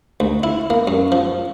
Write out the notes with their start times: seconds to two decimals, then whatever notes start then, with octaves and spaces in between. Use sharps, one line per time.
0.20 D2
0.43 E4
0.70 A#3
0.88 F#2
1.12 F3